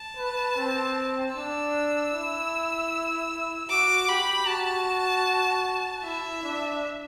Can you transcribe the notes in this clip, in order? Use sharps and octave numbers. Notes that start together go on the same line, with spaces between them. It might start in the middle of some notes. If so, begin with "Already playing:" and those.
Already playing: A5
B4
C4
D4 E6
E4
F#4 D6
G4 B5
F#4 A5
E4 E5
D4